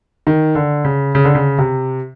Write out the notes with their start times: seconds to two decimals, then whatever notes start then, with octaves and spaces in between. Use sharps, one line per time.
0.27 D#3
0.55 D3
0.85 C#3
1.15 C#3
1.24 D3
1.35 C#3
1.58 C3